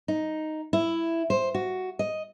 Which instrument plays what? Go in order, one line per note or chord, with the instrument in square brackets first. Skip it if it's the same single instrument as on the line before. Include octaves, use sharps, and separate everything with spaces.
[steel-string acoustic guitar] D#4
E4
C5
F#4
D#5